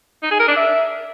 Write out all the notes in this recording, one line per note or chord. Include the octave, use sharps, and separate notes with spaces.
D#4
G#4
A#4
D4
E5